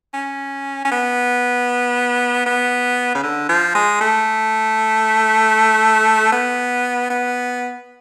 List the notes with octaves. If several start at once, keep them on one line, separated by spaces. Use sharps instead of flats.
C#4
C#4
B3
B3
C#3
D3
F3
G#3
A3
B3
B3